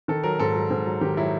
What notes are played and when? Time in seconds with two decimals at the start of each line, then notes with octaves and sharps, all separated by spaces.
0.08 D#3 A4
0.23 F#3 A#4
0.39 G#2 A4
0.55 F#3
0.70 G#2
0.86 F#3
1.01 D#3 G4
1.17 F#3 E4